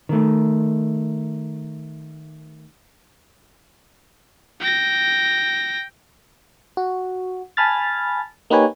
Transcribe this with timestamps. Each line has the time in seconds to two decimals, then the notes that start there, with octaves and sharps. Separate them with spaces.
0.09 D#3 A3
4.60 G5 A#6
6.77 F#4
7.57 G#5 A5 B5 F6 A6
8.50 A#3 D#4 G4 B4 C#5 G#5